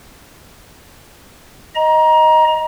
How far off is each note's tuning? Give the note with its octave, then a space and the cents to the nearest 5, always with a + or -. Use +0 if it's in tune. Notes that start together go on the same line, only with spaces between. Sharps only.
D#5 +5 A#5 +25